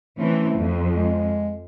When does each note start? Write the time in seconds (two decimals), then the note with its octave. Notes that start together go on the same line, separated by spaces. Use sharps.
0.19 E3 A3 C4 C#4
0.57 F2
0.96 G#3